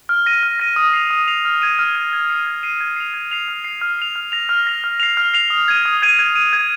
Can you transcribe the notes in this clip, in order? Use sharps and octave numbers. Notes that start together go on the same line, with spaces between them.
F6
A#6 D#7
F6
A#6 D#7
D#6
C7 F7
D#6
C7 F7
F6
G#6 D#7
F6
G#6 D#7
G#6
C7 D#7
G#6
C7 D#7
G#6
C7 F7
G#6
C7 F7
F6
C7 F7
F6
C7 F7
F6
A#6 F7
F6
A#6 F7
F6
C7 F7
F6
C7 F7
D#6
G#6 D#7
D#6
G#6 D#7
G#6
D#7
G#6